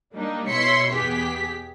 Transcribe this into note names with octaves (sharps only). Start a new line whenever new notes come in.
G3 A#3 D4 D#4
B2 E4 C#5 C6 B6 C#7
E2 B3 G4 G#4 B6